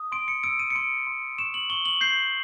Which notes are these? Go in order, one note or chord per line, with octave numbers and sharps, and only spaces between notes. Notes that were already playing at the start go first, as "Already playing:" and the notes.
Already playing: D#6
C6 D7
C#7
E6 D7
D#7
C#7
C6 D7
C6
C#6 E7
F#7
C#6 G7
F#7
G6 C7